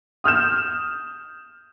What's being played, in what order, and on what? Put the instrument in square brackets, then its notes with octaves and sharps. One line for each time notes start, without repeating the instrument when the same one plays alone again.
[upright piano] D#6 F6 G6 E7